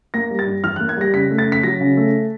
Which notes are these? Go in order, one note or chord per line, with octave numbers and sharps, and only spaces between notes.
A#3 A#6
G3
A6
G2
E3 F6
F#6
A#3
G#6
G3 A#6
C#3 B6
A3
A6
C#3
B6
F#3 A#6
C#3
A3